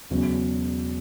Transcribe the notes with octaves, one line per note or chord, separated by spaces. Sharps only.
E1 E2 C#3 F#3